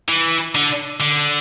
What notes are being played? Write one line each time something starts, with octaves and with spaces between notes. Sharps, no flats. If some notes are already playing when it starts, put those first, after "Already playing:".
E3
D3
D3